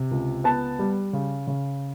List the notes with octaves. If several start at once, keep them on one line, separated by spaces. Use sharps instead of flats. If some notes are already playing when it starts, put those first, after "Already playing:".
Already playing: C3
C#2
B3 A5
G3
C#3
C#3